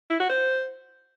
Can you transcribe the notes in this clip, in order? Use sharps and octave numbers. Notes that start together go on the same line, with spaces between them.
E4
F#4
C5